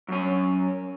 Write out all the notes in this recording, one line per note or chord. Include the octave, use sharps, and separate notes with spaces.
F#2 C#4